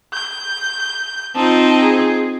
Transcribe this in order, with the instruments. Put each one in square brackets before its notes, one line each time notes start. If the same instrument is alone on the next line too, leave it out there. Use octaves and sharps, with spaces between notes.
[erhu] G6
[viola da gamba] C4 D#4 F4 [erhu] A5
[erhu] G#4